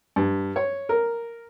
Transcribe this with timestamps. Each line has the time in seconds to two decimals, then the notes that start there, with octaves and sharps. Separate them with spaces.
0.16 G2
0.56 C#5
0.89 A#4